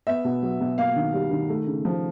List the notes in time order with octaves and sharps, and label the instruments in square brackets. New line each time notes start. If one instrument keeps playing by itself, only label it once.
[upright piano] B3 E5
B2
F#3
B2
A#3 F5
D#3
G3
D#3
A3
C#3
F3